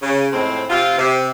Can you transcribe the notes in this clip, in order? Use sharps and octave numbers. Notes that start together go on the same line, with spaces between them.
C#3
F2 A2 G#3 C4
C3 F4
C3